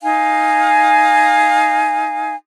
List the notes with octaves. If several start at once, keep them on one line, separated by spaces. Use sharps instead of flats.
D#4 F5 G#5